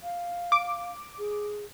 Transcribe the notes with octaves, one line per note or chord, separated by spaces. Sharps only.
F5
D6
G#4